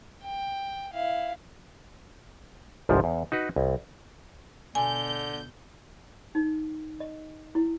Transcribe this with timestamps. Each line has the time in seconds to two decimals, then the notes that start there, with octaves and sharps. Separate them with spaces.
0.23 G5
0.93 E4 F5
2.89 G1 C2 G#2 F3
3.04 E2
3.32 D#4 F#4 B4
3.56 C2
4.75 B2 D3 G#5 G6
6.35 D#4
7.00 D#5
7.55 E4